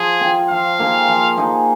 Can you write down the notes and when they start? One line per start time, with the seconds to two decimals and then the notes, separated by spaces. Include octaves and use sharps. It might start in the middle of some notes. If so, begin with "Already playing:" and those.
Already playing: F3 G#4
0.21 C4 F4
0.50 F3 F5
0.79 A#3 D#4 G#4
1.08 F3
1.37 A#3 D#4 G#4